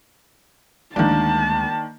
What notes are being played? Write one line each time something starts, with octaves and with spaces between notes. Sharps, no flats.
D2 D#3 G#3 A#3 D4 A5